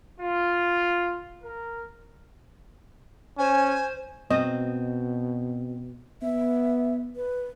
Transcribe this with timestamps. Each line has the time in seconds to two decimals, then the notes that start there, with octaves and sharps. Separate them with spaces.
0.19 F4
1.43 A#4
3.38 C#4 C5 G#5
4.31 B2 C4 D#5
6.22 B3 E5
7.16 B4